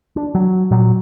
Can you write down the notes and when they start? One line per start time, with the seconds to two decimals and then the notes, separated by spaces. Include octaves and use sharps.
0.16 D4
0.35 F#3
0.71 A#2 F#3